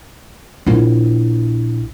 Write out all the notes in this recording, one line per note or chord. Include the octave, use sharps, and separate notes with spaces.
A#1 E4